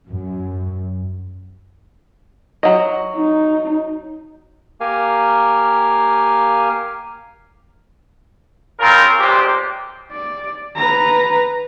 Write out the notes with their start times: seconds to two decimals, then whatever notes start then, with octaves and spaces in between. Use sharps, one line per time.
0.10 F#2
2.63 F#3 D#5
3.16 D#4
4.81 A#3 G4 A#4 F5 G#5
8.79 C#3 C4 F4 A#4
9.20 B1 A#2 G#3 G4 C5
10.11 D5
10.76 B4 A#5